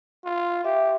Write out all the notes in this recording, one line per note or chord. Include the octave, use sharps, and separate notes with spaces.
F4
G4 E5